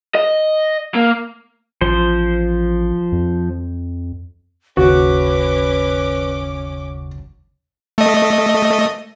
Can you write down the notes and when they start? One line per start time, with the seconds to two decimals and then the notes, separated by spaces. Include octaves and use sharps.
0.15 D#5
0.95 A#3
1.81 A1 F3 C5
3.12 F2
4.77 G1 D#2 C#3 C#4 F#4 B4 D6
7.98 A3 D#5